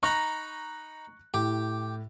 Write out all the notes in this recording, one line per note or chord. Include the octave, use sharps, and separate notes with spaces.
D#4 A#5 B5 C#6 F#6
A2 G4